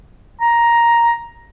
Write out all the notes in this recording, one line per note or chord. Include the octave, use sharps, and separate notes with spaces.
A#5